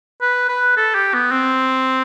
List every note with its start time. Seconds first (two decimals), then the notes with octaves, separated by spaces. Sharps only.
0.22 B4
0.49 B4
0.77 A4
0.95 G4
1.14 B3
1.32 C4